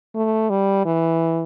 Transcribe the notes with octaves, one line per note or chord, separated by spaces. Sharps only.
A3
G3
E3